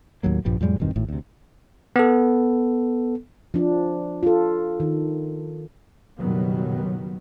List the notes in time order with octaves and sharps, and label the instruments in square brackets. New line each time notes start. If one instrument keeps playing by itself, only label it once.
[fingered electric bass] D#2 A2 F#3 A#3
A#1 G2 F3 G3
F2 A2 G3 G#3
E1 G2 D#3 C4
G#1 A2
D2 C3
[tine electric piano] B3 A4
[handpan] F3 D4
F4 A4
D#3
[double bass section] F#1 B2 D#3 F#3 G3 B3